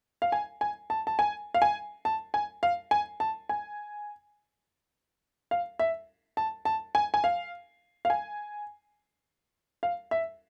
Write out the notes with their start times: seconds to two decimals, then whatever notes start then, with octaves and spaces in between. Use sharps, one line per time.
0.22 F5
0.32 G#5
0.61 G#5
0.90 A5
1.07 A5
1.19 G#5
1.54 F5
1.62 G#5
2.05 A5
2.34 G#5
2.63 F5
2.91 G#5
3.20 A5
3.49 G#5
5.51 F5
5.79 E5
6.37 A5
6.65 A5
6.95 G#5
7.14 G#5
7.24 F5
8.05 F5
8.10 G#5
9.83 F5
10.11 E5